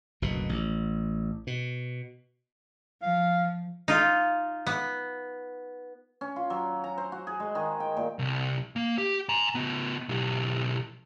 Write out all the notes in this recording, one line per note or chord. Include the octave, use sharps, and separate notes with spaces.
F#1 D2 B2
A1
B2
F3 F5
D#4 F4
B3
C#4
F4
F#3
A#5
C5
F#4
G#4
G#3
D#3
G5
A#2
C2
A#3
G4
G#5 A#5
C#3 B3
B1 G4